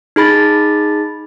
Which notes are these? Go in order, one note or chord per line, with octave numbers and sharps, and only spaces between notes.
D#4 G#4 B5 A6